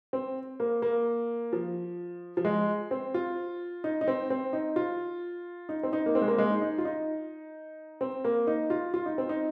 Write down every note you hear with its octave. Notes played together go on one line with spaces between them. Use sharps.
C4
A#3
A#3
F3
F3
G#3
C4
F4
D#4
D#4
C4
C4
D#4
F4
D#4
C4
D#4
A#3
C4
G#3
A#3
G#3
D#4
D#4
F4
D#4
C4
A#3
D#4
F4
F4
D#4
C4
D#4